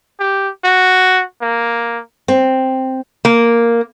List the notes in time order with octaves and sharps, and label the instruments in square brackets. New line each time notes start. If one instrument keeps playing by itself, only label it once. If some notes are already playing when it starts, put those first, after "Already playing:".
[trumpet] G4
F#4
A#3
[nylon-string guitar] C4
[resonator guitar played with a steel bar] A#3